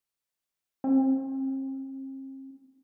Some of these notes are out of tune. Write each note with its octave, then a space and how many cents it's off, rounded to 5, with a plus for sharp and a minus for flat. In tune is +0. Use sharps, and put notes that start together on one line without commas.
C4 +40